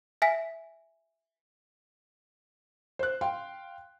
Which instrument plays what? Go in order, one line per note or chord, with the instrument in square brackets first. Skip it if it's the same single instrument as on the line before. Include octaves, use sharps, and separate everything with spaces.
[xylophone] E5 G#5 B6
[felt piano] C5 F#6
F5 G5 C6